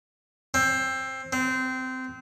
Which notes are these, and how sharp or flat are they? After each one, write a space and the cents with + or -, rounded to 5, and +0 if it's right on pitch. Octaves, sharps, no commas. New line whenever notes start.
C4 +15
C4 -20